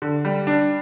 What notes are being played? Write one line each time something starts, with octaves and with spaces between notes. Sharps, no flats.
D3
G3
D4